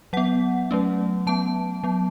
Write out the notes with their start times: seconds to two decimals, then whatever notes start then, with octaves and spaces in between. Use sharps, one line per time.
0.13 F#3 B3 F#5
0.71 F#3 A3 C#4
1.27 F#3 B3 A5
1.84 F#3 B3